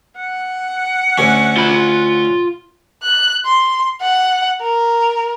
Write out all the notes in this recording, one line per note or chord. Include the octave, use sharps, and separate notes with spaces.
F#5
D2 C#4
F4 B5
F#6
C6
F#5
A#4